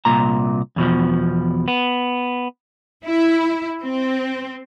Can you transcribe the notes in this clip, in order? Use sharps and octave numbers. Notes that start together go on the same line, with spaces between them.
C2 A#2 A#5
E2 B2 F3
B3
E4
C4